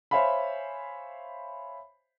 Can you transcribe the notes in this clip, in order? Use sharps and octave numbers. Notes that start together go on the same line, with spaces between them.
C5 C#5 E5 F5 G#5 B5